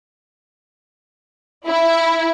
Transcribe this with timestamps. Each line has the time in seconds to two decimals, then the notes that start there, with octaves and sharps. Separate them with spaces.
1.68 E4